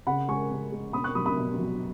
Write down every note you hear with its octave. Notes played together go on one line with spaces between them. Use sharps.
C#3 F#5 B5
G#3 G#5 C#6
C#3
G#3
B2 B5 D#6
C#6 F#6
F#3 B5 D#6
B5 D#6
B2
F#3